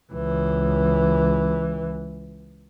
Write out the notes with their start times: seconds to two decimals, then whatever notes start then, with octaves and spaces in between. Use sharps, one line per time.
0.12 C#2 E3